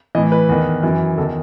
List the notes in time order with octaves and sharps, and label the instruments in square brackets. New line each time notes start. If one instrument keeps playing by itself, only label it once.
[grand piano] A2 E3 D#5
B4
E2 D#3
F#2 E3
E2 A4
D#3